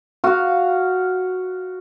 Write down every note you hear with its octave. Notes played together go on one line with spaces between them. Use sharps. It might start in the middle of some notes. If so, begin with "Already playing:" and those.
F#4 F5